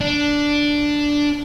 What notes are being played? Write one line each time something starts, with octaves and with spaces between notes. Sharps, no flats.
D4